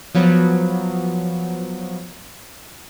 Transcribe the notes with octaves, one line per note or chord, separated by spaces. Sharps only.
F3 F#3 B3